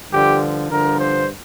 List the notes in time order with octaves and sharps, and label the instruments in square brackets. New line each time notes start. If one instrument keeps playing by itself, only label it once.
[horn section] G2 D3 F3 G4
G2 D3 F3 A#4
C5